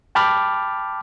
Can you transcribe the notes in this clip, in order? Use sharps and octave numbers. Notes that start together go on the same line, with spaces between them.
G5 A5 B5 D6 F6